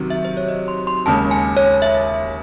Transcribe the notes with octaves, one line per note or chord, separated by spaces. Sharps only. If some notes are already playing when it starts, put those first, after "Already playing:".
Already playing: C3 D#3 F#3
E5
C5
C#5
D#5
C6
C6
D#2 C#3 G#3 A5
G#5
C#5
E5